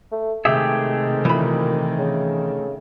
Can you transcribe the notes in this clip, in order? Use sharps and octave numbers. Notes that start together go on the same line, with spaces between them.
A3
C3 D#3 G#3 A3 G4 G#4 E5
A#2 E3 B5
C#3